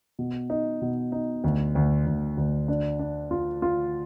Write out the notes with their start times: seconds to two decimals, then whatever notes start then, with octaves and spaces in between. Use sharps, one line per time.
0.19 B2
0.50 D#4
0.82 B2
1.12 D#4
1.44 D2
1.75 D2
2.06 D2
2.38 D2
2.68 D4
2.99 D4
3.31 F4
3.62 F4